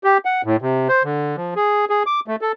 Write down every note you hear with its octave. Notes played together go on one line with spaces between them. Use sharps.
G4
F#5
A2
C3
C5
D3
F3
G#4
G#4
D6
A3
A4